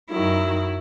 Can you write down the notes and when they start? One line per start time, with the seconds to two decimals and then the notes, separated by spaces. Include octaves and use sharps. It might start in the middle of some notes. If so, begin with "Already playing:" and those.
0.12 F#2 D#3 F#3 E4